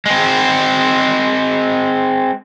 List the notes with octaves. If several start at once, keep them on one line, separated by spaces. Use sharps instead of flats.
G#3 C4